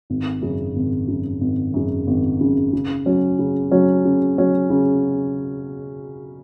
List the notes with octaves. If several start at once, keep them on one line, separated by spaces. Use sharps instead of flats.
G#1
F#2 C#3
G#1
F#2 C#3
G#1
F#2 C#3
G#1
F#2 C#3
C#3
F#3 C#4
C#3
F#3 C#4
C#3
F#3 C#4
C#3